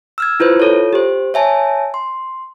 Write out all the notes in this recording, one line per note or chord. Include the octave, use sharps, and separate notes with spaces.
E6 F6 G#6
E4 F4 B4 C5
F4 A4 C#5
G4 C5
C#5 E5 G#5 A5
C6